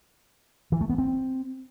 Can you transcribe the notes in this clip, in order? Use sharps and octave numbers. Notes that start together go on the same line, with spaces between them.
E3
A3
B3
C4